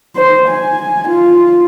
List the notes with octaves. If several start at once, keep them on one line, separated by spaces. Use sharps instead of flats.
C5
G#5
F4